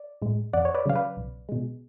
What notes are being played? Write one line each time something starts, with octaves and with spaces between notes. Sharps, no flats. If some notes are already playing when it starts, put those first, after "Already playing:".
Already playing: D5
A2 G#3
F2 D5 F#5
C#5
B4 D5
C#3 F#3 F5
B4 D5
B1
B2 G#3